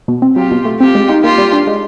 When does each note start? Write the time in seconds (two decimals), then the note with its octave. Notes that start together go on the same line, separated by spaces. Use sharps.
0.08 B2
0.22 C4
0.36 F#3 F4 G4
0.51 B2
0.65 A3
0.80 C4 F4 G4
0.95 G#3
1.09 D#4
1.23 A#3 F4 G4
1.38 G3
1.53 D4
1.67 G#3